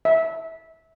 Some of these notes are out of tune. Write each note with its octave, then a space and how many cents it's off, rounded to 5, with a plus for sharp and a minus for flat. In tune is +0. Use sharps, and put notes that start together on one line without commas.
E5 -20